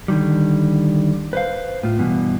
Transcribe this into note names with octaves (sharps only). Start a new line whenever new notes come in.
D3 D#3 G3
B4 C5 F5
A2 F4
G2 B2 E3